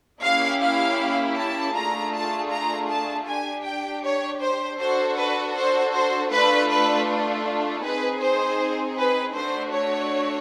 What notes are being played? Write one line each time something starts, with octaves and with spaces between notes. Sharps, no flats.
A#3 C#4 E4 G4 F5
F5
A5
A3 D4 F4 G#4 A#5
A5
A#5
A5
D4 G4 G#5
G5
C#5
C5
D4 F#4 A4 C5
B4
C5
C5
A3 D4 F4 A4 B4
B4
C4 D#4 G#4 B4
C5
B4
A3 D4 F#4 C5
C#5